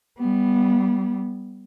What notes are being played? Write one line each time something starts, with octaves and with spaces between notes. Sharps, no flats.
G3 B3